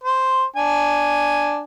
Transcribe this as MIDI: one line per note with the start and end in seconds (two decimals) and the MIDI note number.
0.03 0.44 72
0.56 1.62 62
0.56 1.62 80